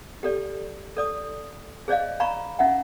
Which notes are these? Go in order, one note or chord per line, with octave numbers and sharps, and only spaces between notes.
G4 A4 D5
A4 D5 D#6
G#4 C5 D5 D#5 F5
F5 A#5 B5 C#6
C#4 D#4 E5 F#5